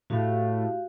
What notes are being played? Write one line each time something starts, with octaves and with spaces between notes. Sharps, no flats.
A2 F#4 G4 F5